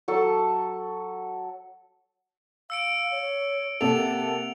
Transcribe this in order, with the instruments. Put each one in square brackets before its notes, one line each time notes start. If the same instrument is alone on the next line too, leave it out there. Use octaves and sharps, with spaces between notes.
[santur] F#3 A4 A5
[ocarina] F5 [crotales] E6 C#7 D7
[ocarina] C#5
[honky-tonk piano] C3 A#3 A4 [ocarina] F#5 [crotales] F7